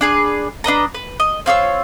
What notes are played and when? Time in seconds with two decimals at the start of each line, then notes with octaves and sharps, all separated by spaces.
0.01 D4 G#4 B4
0.64 D4 B4 D#5 A#5
0.94 B4
1.20 D#5
1.46 C4 F4 C#5 E6